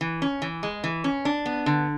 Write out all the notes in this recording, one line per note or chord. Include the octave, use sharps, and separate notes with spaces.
E3
C#4
E3
G#3
E3
C#4
D4
B3
D3